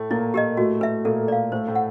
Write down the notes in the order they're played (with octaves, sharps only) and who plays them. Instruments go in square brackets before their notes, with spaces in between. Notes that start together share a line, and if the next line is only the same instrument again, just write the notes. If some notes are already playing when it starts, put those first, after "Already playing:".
Already playing: [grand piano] A2 A3
[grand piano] A#2 A#3 [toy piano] E4
[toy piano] G4 A#4 D#5
[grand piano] A2 A3 [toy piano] F#4
[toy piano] B4 E5
[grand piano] A#2 A#3 [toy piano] A4
[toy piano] D5 F5
[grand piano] A2 A3 [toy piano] C5
[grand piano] A2 A3
[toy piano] F#5